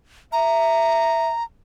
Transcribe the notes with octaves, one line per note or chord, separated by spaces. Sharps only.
E5 A#5